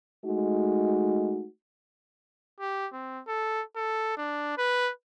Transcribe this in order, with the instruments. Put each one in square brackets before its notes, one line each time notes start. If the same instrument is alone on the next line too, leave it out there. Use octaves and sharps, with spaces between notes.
[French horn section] G#3 A3 D#4 F#4
[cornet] G4
C4
A4
A4
D4
B4